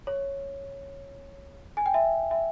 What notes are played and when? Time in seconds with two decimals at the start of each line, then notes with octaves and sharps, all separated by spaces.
0.07 C#5
1.77 G#5
1.86 G5
1.94 E5
2.31 E5